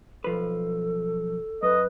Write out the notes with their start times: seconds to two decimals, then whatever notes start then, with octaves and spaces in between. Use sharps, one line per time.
0.24 B1 F3 A4 B4
1.62 F#2 B4 D#5